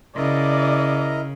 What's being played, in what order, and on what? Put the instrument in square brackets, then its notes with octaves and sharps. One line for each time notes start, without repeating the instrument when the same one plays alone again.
[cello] C#3 [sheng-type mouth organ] E4 A#4 D#5 [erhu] D5